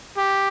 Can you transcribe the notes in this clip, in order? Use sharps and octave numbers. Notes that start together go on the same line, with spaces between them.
G4